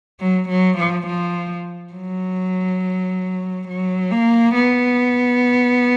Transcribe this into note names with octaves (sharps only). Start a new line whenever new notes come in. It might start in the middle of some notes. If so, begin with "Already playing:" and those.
F#3
F#3
F3
F3
F#3
F#3
A#3
B3